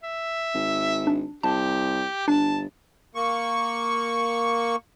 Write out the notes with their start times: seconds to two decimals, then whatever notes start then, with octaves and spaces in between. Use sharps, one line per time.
0.03 E5
0.55 G#1
1.07 D4
1.43 C2 G4 A5
2.28 G1 D4 A5
3.15 A#3 C#6